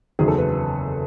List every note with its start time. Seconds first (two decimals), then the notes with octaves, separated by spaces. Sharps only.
0.19 F#1 E2 D#3 F#3 G#4
0.28 A4
0.38 B4